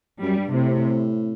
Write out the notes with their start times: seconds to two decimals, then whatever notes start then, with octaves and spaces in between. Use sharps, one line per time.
0.22 F#2 G3
0.38 G2
0.54 A2 C3